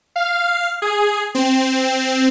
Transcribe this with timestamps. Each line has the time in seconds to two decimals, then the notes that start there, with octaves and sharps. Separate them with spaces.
0.16 F5
0.82 G#4
1.35 C4